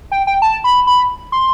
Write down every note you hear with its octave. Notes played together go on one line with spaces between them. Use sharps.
G5
G5
A5
B5
B5
C6